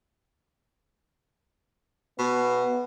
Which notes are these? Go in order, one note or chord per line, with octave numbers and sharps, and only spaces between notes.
B2 B3